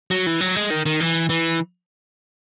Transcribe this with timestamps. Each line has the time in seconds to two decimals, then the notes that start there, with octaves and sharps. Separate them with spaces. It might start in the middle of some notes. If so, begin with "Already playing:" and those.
0.11 F#3
0.26 E3
0.41 F#3
0.55 G#3
0.70 D#3
0.86 D#3
1.00 E3
1.29 E3